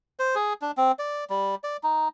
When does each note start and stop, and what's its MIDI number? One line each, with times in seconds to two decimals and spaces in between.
0.19 0.35 72
0.35 0.53 68
0.61 0.71 62
0.77 0.92 60
0.99 1.24 74
1.30 1.55 55
1.64 1.77 74
1.83 2.08 63